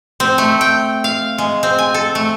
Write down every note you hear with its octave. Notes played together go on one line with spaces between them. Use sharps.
C4
A3
G5
F5
G#3
C4
G#5
A4
A3